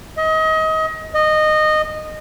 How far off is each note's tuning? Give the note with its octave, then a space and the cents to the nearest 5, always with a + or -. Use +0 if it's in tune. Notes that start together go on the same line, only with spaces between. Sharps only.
D#5 +30
D#5 -15